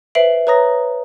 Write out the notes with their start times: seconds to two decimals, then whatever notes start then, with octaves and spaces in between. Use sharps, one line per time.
0.15 B4 C5 E5 C7 D7 F#7
0.47 B4 C#5 A#5 D#6 A#6